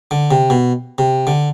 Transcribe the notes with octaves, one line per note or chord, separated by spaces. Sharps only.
D3
C3
B2
C3
D3